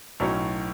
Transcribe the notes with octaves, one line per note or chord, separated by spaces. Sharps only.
B1 A2 F#3 C#4